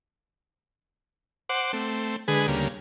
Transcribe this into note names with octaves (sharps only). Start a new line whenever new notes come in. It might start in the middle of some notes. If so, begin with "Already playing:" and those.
C5 F#5 D6
A3 C4
D3 G#3 G#4 B4
D2 C#3 G3 A#3